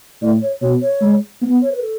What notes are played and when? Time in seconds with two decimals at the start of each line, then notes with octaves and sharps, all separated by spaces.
0.21 A2 D5
0.42 C#5
0.61 B2 C#5
0.82 C#5
1.01 G#3
1.42 B3
1.62 C#5
1.71 B4
1.81 A4